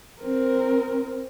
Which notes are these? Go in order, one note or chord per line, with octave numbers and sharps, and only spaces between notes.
C4 A#4